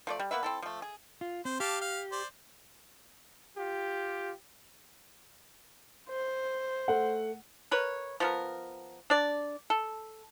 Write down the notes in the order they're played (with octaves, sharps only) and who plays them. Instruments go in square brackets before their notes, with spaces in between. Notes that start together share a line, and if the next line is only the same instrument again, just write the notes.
[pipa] F3 A3 D5
G3
A#3 B3 B4 E5
C4 E4 A4
F3 A3
G#4
[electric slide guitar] F4
[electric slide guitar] C4 [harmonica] C5
[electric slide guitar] G4 [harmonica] F5 A5 D6
[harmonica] F5
C5 D5
[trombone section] F4 G4
[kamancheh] C5
[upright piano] A3 F#5
[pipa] A#4 B4 C#5
F3 B3 A#4
D4 D5
A4